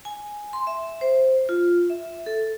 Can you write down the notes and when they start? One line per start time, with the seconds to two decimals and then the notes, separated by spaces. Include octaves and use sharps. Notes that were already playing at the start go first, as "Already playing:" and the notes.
0.05 G#5
0.53 C6
0.67 E5
1.01 C5
1.49 F4
1.90 E5
2.26 A4